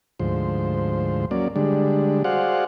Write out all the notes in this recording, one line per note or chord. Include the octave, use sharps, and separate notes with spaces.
D2 G#2 F3 C5
F#3 A#3 C#4 D5
D3 G3 G#3 D4
F#4 G#4 C5 D5 F5 F#5